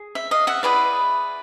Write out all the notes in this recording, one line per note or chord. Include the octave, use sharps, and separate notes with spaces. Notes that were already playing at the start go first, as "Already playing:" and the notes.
Already playing: G#4
E5
D#5 F5
E5 F#5
E4 G#4 B4 D5